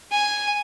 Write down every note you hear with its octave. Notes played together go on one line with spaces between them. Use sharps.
G#5